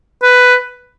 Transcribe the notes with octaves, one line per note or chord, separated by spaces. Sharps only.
B4